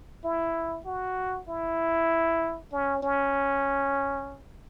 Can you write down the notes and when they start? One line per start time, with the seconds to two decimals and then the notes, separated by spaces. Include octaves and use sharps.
0.24 E4
0.86 F#4
1.48 E4
2.73 C#4
3.03 C#4